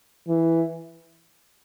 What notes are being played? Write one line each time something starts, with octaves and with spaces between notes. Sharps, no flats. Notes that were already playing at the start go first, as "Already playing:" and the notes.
E3